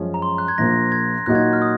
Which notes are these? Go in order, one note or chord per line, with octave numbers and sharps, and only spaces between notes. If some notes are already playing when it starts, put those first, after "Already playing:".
Already playing: F#2 F3 G#3 C#4
A#5
C6
F#6
G#6
A#1 A#2 F3 A#3 A#6
G#6
A#2 F#3 A#3 D#4 F#4 F#6
G#6
F6
D#6